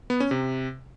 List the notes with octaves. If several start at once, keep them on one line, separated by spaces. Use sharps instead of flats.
B3
C#4
C3